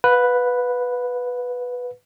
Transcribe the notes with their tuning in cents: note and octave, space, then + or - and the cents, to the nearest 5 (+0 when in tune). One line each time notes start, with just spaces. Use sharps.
B4 +0 F5 +45